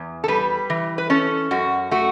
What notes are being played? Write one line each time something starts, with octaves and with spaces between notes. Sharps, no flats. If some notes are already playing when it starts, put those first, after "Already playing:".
Already playing: E2
A4
G3 B4
E3
B4
C#4 A4
F#2 F#4
A3 F#4